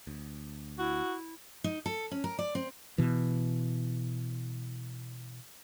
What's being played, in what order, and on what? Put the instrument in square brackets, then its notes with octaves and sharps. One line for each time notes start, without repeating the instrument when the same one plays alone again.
[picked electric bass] D2
[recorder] E4 [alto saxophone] F#4
[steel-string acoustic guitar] D#4
A4
C#4
A#4
D5
C4
[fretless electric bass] B2 E3